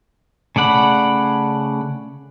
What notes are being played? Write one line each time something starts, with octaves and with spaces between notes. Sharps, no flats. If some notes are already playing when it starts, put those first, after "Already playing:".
C#3 A3 D5 F#5 B5